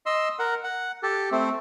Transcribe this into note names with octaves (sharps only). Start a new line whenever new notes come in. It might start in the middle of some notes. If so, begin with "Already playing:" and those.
D#5 C6 E6
A#4 F#5
F#5
G4 A4
A3 C4